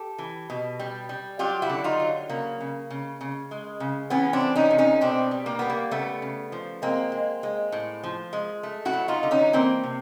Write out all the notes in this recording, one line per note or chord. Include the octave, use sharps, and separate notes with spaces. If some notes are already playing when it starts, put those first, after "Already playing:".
Already playing: G4 A4
E3
B2
G3
G3
F#3 F4 G4
E4 F#4
D3
D#4 F4
F#3
C#3 A#3
C#3
C#3
C#3
G#3
C#3
E3 B3 C#4
C4 D4
A3
C#4 D#4
C3
C#4 D#4
B2 C4 D4
G3
A#3
G3 B3
A#3
C#3 A3 B3
C#3
F3
G#3 A#3 C4
G#3
G#3
A2
F3
G#3
A3
E4 F#4
F#3
D#4 F4
D3
C#4 D#4
E3 A#3 C4
C3